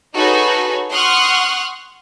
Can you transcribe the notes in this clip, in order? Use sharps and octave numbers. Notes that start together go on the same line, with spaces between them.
D#4 F#4 G#4 A4 B4 C#5
F#5 C6 C#6 D#6 F6 F#6